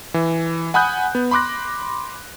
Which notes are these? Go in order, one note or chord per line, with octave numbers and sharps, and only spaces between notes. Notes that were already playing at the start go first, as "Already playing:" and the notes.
E3
F#5 G#5 B5 D#6 F#6 G6
B3
B5 C6 D6 F#6 A#6